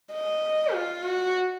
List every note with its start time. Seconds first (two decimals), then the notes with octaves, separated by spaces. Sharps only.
0.13 D#5
0.73 F4
1.03 F#4